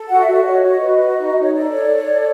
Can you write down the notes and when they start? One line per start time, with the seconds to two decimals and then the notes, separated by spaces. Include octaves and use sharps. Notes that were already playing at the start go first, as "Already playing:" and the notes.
Already playing: A4
0.09 F#4 F#5
0.21 E5
0.27 F#4
0.33 D5
0.45 C#5 D#5
0.63 F#4
0.81 B4
0.99 F#4
1.18 D#4
1.35 D#4
1.42 C#5
1.53 A4 D5
1.72 C#5
1.90 C#5
2.08 A4